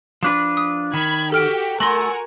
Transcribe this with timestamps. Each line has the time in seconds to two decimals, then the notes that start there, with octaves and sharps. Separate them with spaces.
0.23 F3 D4 B4
0.57 D#6
0.94 D#3 B5 G#6
1.32 F#4 G4 A4 G5 F6 D7
1.80 A3 F#4 A#4 G#5 C6 A#6 F#7